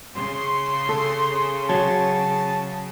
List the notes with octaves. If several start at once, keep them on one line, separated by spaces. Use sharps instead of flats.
C#3 C6
A4
F#3 A5